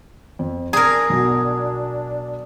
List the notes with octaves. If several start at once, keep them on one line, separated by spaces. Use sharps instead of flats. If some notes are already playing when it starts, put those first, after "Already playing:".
F2
D4 G#4 A#4 A#5 G#6
B1 F#3